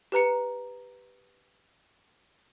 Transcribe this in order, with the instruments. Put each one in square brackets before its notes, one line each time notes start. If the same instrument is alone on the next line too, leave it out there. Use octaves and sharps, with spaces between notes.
[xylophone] G4 B4 A#5 C#7